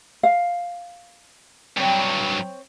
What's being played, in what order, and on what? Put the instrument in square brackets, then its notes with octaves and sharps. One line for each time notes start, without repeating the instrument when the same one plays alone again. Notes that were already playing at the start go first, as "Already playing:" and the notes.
[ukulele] F5
[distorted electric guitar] G2 F#3 [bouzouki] C4 C#5